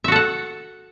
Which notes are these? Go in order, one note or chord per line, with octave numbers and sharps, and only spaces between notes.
F#4 A4 E5 F#5